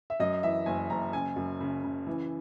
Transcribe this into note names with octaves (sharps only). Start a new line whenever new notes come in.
E5
F#2 D#5
E3 E5
F#1 G#5
F#1 A#5
C#3 G#5
F#2
C#3
C#3
E3